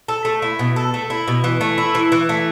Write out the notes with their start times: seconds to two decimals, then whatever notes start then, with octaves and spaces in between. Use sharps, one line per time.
0.08 A4
0.25 A3
0.42 E4
0.59 B2
0.76 A4
0.94 A3
1.10 E4
1.28 B2
1.44 E3
1.61 A3
1.78 E4
1.95 E3
2.12 E3
2.29 A3